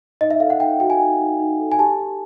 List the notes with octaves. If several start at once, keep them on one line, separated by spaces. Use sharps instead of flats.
D#4 D#5
E5
A4 F5
F#5
D#4 G5
F#4 G5
G#5
D#4
D#4
D#4
A4
G#5
G4 A5
G4